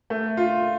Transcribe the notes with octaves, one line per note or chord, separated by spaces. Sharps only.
A3
F4